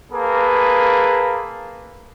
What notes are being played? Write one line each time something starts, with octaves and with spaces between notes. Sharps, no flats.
A#3 G#4 A4 B4